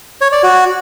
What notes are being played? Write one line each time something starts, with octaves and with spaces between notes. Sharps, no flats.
C#5
D5
F#4